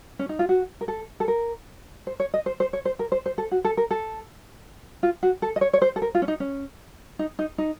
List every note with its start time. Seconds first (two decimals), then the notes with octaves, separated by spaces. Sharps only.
0.19 C#4
0.29 D#4
0.39 F4
0.49 F#4
0.81 A#4
0.88 A4
1.20 A4
1.28 A#4
2.07 C5
2.20 C#5
2.34 D#5
2.46 C5
2.60 C5
2.73 C#5
2.85 C5
2.99 A#4
3.12 C5
3.26 C5
3.38 A4
3.51 F#4
3.65 A4
3.77 A#4
3.91 A4
5.03 F4
5.23 F#4
5.42 A4
5.56 D#5
5.61 C#5
5.73 C#5
5.82 C5
5.96 A4
6.02 A#4
6.15 F4
6.22 C#4
6.28 D#4
6.40 C#4
7.19 D#4
7.39 D#4
7.58 D#4